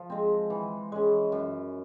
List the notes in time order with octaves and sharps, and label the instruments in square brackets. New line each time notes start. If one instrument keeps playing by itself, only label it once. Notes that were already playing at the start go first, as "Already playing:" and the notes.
Already playing: [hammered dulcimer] F3
G#3 C4
E3
G#3 C#4
F#2